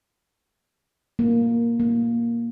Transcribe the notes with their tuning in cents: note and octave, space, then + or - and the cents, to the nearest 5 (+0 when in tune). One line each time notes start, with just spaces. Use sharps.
A#3 +5
A#3 +5